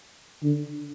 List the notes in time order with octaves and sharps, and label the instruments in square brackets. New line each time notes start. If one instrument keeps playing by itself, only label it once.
[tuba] D3